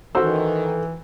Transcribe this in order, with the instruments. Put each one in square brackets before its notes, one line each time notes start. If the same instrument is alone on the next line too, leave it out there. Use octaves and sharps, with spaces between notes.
[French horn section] D#3 [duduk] E3 [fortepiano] F#4 C5 E6 [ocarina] A4